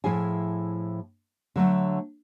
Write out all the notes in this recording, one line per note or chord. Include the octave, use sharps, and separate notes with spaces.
A2 F3 E4 G#4 G#5
D3 F#3 A3